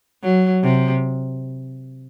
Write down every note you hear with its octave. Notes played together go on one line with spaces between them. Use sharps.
F#3
C3